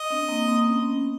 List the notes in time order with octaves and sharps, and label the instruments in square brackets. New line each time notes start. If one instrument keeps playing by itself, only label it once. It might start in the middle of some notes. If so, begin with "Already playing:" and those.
Already playing: [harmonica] D#5
[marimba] C4 D4
A#3 C4
A#3 C4
B3 C#4